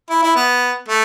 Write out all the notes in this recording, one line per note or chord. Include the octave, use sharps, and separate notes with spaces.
E4
E4
B3
A3